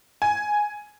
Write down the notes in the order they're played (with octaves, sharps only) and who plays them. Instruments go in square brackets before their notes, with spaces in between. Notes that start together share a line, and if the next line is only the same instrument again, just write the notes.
[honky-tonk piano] G#5